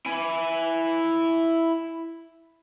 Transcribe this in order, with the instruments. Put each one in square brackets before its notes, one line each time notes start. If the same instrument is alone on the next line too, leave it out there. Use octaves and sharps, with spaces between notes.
[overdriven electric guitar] E4 G#5